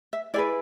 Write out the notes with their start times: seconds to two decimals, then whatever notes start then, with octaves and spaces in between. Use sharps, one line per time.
0.13 E5
0.34 E4 G#4 B4 D5